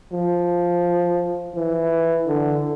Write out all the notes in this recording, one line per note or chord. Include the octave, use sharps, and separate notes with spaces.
F3
E3
D3